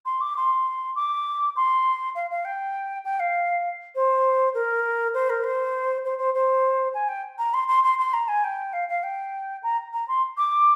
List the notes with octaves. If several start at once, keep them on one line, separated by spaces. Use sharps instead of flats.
C6
D6
C6
D6
C6
F5
F5
G5
G5
F5
C5
A#4
C5
A#4
C5
C5
C5
C5
G#5
G5
A#5
C6
C6
C6
C6
A#5
G#5
G5
F5
F5
G5
A#5
A#5
C6
D6